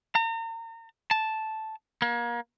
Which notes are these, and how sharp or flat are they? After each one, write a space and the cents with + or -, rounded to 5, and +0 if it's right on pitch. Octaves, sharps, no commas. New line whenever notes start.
A#5 -40
A5 -5
A#3 +30